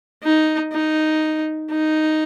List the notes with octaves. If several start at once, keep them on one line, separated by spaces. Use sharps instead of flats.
D#4
D#4
D#4